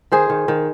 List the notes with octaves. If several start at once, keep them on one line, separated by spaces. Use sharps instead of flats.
D#3 G#4 C5
D#3
D#3